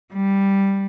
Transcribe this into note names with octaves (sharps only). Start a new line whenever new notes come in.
G3